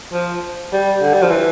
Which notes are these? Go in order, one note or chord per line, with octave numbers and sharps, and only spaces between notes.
F3
G3
D3
G3
F3
E3